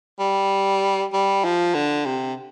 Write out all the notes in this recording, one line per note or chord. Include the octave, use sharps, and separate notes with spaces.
G3
G3
F3
D3
C3